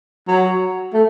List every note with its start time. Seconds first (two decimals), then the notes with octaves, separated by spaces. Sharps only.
0.28 F#3
0.94 A3